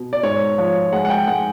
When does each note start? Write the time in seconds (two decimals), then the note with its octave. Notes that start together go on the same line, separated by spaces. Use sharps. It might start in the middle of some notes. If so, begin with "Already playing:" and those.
Already playing: B2
0.13 D5
0.23 G#2 C#5
0.58 F3 C#5
0.93 G#3 F#5
1.05 F#5
1.10 G5
1.27 G#3 F#5